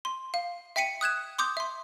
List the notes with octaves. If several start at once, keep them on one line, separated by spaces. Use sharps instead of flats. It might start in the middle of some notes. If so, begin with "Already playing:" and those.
C6
F5
E5 G5 B6 C#7 D#7
D#6 F#6 G#6 E7
C6 D6 D#6 G6
E5 C6